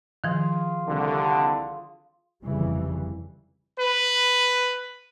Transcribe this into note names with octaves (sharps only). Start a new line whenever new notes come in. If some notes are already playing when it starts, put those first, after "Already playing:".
D#3 F3 F4 G#4 F5
C2 D3
G1 F2 G#2 C#3 E3 G3
B4